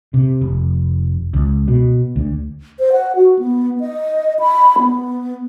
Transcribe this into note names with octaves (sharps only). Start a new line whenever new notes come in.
C3
F1
C#2
B2
D2
C5
F#5
F#4
B3
D#5
B5
B3